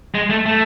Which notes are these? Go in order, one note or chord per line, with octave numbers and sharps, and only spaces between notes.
G#3
A3
A3